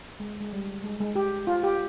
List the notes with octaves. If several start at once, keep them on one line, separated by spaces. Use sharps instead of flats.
G#3
G#3
G3
G#3
G#3
G4
F4
G4